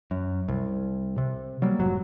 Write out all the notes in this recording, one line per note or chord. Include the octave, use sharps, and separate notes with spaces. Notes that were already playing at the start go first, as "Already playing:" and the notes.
F#2
C2
C3
F#3 G3 A#3
F1 G#2 F#3